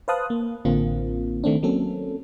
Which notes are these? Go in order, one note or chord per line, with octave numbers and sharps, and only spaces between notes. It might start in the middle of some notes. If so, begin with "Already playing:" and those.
B4 C5 F5 A5 D#6 F#6
A#3
A1 D3 A#3 C4 F4
D#3 A3 C4 D4
F#3 A#3 C4 C#4 A4